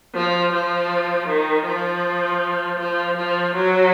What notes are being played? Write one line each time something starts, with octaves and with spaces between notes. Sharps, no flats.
F3
F3
D#3
F3
F3
F3
F#3